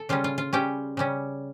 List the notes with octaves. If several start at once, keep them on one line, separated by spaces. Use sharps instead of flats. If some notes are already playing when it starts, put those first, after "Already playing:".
Already playing: A4
C#3 G3 C#4 F4
F4
F4
C#3 G3 C#4 G4
C#3 G3 C#4